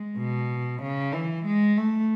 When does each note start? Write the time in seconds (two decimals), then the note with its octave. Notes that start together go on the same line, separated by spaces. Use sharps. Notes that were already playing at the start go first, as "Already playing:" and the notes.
Already playing: G#3
0.18 B2
0.83 C#3
1.14 E3
1.46 G#3
1.77 A3